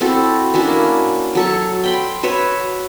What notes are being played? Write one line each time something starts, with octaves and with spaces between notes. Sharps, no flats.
C4 E4 F#4 A4
C#4 D4 E4 F#4
A#3
F#3 A4 C#6
G5 B5 C6
F#4 B4 C#5 E5